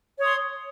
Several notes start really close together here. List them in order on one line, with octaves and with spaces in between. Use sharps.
C#5 D#6 C6